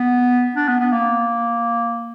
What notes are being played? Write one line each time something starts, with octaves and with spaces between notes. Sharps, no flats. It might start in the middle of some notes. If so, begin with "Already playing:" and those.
Already playing: B3
D4
B3
B3
A#3